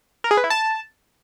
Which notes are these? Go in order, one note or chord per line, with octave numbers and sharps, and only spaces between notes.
A#4
G#4
B4
E4
A5